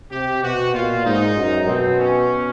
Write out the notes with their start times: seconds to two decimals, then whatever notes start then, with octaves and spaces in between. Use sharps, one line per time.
0.11 C3 G4
0.42 B2 F#4
0.73 A#2 F4
1.05 G#2 D#4
1.37 F#2
1.67 B2 C4
1.99 C#4